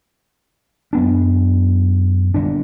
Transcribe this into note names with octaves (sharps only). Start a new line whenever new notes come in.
F#2 B3 D4
G1 A#2 D4